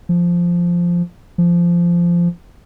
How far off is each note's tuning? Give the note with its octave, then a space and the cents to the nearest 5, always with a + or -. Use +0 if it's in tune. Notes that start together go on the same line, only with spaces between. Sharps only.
F3 -5
F3 -15